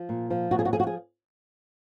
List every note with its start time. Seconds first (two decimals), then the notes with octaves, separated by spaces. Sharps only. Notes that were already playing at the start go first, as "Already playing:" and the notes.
Already playing: F3
0.09 A#2
0.30 F3
0.51 A#2 F#4
0.59 G#4
0.65 F#4
0.73 F3 G#4
0.80 F#4
0.87 G#4